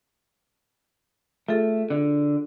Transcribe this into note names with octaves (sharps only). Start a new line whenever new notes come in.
A3 F4 G#4 A4
D3